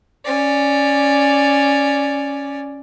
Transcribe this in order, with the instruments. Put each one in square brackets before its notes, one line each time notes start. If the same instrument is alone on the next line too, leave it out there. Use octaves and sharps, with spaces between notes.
[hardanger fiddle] C#4 D5